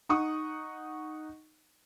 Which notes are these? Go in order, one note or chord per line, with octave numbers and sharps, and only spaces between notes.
D#4 F#5 C#6 D#6